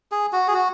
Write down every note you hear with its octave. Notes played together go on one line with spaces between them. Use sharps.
G#4
F#4
G#4
F#4